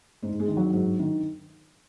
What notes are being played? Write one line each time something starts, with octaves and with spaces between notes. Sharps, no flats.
G#2 G#3
G#3
D#3
F#3
G#2
D#3